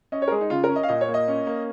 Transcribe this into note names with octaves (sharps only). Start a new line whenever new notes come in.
C#4 D#5
C#5
A#4
G#3 G#4
D#4
C#3 F4
A#4
C#4
D#5
F5
A#2 D#5
C#5
A#3
D#5
C#4
A#3